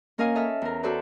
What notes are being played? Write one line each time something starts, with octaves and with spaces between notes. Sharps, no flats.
A#3 C#4 A#4 D#5 F5 G#5
A4 D#5 E5 F6
E2 A#4
F#4 A4 B4 C5 D5